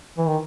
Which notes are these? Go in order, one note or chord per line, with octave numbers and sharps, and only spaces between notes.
E3
D#3